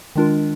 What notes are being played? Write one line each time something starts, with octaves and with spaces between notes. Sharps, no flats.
D#3 G#3 D4 F4 A#4